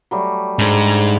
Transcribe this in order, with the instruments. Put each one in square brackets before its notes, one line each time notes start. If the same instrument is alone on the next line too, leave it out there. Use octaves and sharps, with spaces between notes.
[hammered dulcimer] F#3 G3 A3
[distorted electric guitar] G#2 [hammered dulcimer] G3 D4 C5